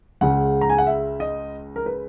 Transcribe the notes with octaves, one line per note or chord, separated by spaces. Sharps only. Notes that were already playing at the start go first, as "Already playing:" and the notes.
C#2 C#3 G#3 F#5
A#5
G#5
F#5
E5
D#5
A#4
B4